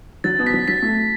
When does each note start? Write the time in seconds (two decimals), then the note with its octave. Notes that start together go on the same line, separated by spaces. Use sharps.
0.24 F#3 A6
0.39 B2
0.47 B6
0.53 F#3
0.68 F#3 B6
0.82 A3